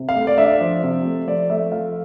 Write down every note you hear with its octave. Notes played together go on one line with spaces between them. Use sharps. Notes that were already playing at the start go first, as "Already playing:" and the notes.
Already playing: C3
F5
A3
D5
D4 E5
F3
C3
A3
F3 D5
A3 E5
F3 F5